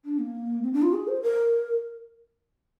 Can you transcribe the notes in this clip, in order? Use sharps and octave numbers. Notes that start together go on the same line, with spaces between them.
D4
A#3
C4
D4
F4
G#4
C5
A#4